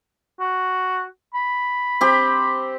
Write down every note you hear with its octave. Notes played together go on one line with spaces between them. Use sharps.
F#4
B5
C4 G4